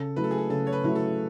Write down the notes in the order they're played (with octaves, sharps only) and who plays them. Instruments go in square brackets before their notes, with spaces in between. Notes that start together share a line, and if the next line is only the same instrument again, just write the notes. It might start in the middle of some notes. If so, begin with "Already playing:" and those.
Already playing: [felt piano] C#3 [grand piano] A4
[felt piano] F#3 A3 E4 [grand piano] B4
[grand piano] A4
G#4
A4
[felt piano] C#3 [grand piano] A4
[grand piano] C#5
B4
[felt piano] F#3 A3 E4
[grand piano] A4